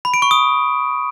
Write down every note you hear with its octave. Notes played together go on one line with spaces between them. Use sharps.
B5
D7
C#6
D#6